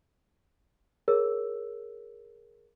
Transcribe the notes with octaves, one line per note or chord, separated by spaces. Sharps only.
G#4 A#4 C#5 E6